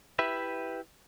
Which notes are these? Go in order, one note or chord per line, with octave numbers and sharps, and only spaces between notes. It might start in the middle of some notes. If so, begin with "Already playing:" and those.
E4 G4 B4 E5